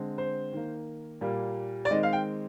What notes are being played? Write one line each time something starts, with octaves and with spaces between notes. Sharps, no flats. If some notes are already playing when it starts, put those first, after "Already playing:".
Already playing: D3 G#3 C4
C5
D#3 A#3
A#2 G3 A#3
D5
D#3 G#3 C4 D#5
F5
G5